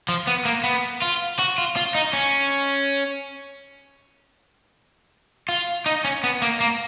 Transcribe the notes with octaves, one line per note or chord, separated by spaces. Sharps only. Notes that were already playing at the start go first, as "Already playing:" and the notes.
F3
B3
A#3
B3
F4
F#4
F4
F4
D#4
C#4
F4
D#4
C#4
B3
A#3
A#3